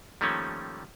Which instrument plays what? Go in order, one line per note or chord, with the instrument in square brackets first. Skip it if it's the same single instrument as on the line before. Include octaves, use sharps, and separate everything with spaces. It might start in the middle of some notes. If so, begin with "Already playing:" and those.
[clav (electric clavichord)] D#3 F3 G3 A3 A#3 C#4